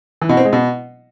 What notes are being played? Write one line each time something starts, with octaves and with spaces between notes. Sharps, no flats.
E3
B2
C4
G#3
B2